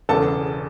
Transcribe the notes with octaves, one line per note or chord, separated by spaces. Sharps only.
E1 E2 C#3 A4 A5